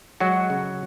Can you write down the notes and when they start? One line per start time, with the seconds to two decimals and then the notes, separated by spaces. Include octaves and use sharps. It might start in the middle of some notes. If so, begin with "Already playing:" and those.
0.20 F#3 G#3 F#4
0.50 C#3